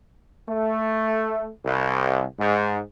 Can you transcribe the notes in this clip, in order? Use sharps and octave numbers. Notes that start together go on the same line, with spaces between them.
A3
C2
G#2